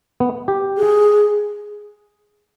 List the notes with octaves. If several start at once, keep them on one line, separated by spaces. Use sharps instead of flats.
B3
G4
G#4